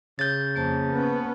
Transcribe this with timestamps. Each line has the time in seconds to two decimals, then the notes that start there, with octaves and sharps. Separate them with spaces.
0.19 C#3 G6 A6
0.56 F2 A#3 C5 A5
0.91 B3 C#4